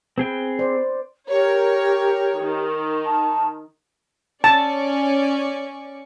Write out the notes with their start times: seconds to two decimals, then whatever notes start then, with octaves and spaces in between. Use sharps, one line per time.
0.18 C4 G#4 B4 G5
0.59 C5 D5
1.30 G4 A#4 C#5
2.39 D#3
3.05 A5
4.44 C#4 D5 A5 C#6